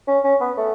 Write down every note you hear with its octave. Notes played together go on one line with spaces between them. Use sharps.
C#4
C#4
B3
A3